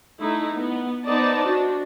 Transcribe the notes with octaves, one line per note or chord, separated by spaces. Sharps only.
A3 D#4 E4
B3
B3 D#4 C5 D5 D#5 A5
D4 F#4